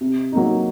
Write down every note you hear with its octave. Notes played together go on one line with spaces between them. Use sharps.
C3
F#3 A#3 D#4